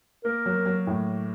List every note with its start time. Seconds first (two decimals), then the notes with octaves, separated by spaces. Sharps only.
0.24 A#3 A#4
0.46 F#3
0.66 F#3
0.87 A2